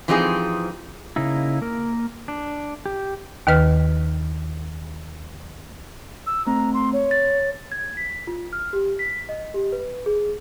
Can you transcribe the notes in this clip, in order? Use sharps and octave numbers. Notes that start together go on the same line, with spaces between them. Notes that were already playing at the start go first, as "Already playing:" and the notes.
E3 F3 C4 D#4 G4 G#4
C#3 A#3 D#4 E4
A#3 A#4
D4
G4
D#2 D#3 B4 F6
E6
A3 C4 A#5
C6
C#5
A6
G#6
B6
F4
F6
G4
B6
D#5
G4
B4
G#4